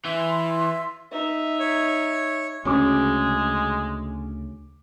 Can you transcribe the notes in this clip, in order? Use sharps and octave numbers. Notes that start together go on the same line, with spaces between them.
E3 E5 C6
D#4 E5
C#5
D2 C#3 G#3 C#4 F#4 D6